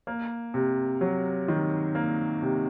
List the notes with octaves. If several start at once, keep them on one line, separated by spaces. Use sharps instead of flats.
A#3
C3
F#3
D#3
A#3
C3